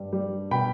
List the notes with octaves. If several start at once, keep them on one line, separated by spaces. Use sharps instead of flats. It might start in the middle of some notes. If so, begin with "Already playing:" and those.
Already playing: G2 G3
G3
B2 G5 B5